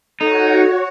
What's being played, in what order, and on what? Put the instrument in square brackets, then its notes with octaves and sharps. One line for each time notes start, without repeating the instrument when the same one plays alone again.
[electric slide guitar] D#4 [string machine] F#4 C#5 [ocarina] A4